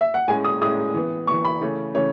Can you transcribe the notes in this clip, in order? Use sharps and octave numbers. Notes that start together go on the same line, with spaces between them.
E5
F#5
A2 G#3 C#4 G#5
D#6
A2 G#3 C#4 D#6
E3 B3
E3 B3 C#6
B5
C#3 E3 A3 C#4
C#3 E3 A3 C#4 C#5